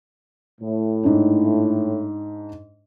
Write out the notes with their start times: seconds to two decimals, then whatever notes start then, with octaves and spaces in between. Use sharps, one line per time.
0.61 A2
1.03 G#2 D4